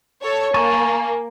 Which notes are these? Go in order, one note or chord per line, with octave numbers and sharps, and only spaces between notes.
A4 C#5
A#3 G#5 A5 C#6